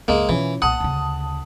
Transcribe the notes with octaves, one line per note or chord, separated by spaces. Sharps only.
C#2 F#2 G#3 A#3
B2 E3 F3 C#4
B1 A#2 F#5 A5 D#6
D2 C#3